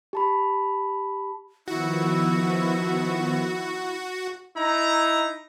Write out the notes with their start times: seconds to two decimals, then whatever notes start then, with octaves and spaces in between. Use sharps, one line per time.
0.13 G4 A5 B5
1.68 D#3 F3 B3 E4 F#4
4.57 D#4 E4 A#5